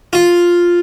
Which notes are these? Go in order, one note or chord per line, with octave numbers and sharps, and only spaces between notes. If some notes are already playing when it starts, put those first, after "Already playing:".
F4